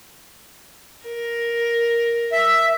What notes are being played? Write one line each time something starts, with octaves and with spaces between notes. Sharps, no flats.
A#4
E5